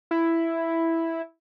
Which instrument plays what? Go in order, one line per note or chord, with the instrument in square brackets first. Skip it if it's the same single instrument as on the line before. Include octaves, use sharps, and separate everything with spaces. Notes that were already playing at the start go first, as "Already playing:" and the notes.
[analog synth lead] E4